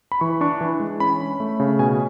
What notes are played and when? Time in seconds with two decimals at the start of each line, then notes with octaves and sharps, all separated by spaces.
0.12 B5
0.21 E3 C#6
0.41 D4 C#6
0.61 E3
0.80 G#3
1.00 C#4 B5
1.20 C#4
1.40 A3
1.60 C#3
1.79 B2 G#5